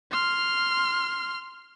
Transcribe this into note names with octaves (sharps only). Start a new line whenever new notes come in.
C6 F6